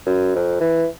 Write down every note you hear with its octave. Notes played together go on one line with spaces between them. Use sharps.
F#2
F2
E3